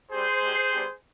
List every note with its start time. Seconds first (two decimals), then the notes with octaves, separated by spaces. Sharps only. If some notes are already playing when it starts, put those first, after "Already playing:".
0.11 G3 C4 G4 G#4 C5
0.42 G#3 D4 G4
0.72 G3 B3 D4 G4